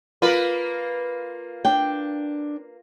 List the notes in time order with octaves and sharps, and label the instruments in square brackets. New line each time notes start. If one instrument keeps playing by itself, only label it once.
[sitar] A#3 A#4 B4 [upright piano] F4
[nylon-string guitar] D4 G5